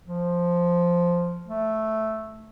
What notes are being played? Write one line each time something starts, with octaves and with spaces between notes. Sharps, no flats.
F3
A3